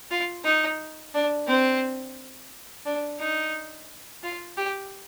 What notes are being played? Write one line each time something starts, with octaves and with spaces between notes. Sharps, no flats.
F4
D#4
D4
C4
D4
D#4
F4
G4